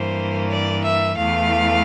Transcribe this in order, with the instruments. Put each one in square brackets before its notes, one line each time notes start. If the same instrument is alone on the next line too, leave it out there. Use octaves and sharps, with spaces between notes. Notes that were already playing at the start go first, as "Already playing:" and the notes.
Already playing: [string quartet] G2 E3 A#3 C5
D5
E5
E2 E3 A3 F5